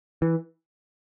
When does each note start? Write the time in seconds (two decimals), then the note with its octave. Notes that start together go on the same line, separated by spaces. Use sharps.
0.22 E3